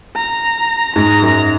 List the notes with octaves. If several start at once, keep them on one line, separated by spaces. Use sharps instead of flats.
A#5
G#2 G#3 A#5
F#2 F#3